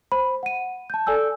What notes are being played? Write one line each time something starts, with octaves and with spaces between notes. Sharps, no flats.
C5 B5
F#5 D#7
A5 G6
A4 D5 G#5 E6 G6